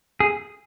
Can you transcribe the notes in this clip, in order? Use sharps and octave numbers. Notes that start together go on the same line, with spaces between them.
G#4